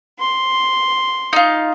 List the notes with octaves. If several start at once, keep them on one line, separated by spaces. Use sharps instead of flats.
C6
D#4 F4